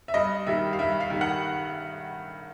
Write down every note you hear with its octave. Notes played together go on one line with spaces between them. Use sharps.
E5
G2 D#5
D#3 G3 E5
F5
G2 E5
F5
D#3 G3
F#5